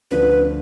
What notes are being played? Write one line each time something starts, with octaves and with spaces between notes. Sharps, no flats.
D2 D3 F3 B4